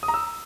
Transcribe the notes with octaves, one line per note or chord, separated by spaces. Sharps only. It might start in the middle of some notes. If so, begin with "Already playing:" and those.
D#6
A#5
E6